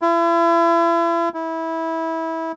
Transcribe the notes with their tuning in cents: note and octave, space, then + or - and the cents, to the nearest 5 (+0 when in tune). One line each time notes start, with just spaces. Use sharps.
E4 +40
E4 -20